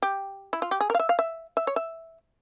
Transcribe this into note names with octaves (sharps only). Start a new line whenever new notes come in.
G4
E4
F4
G4
G#4
A#4
F5
E5
F5
E5
E5
C#5
E5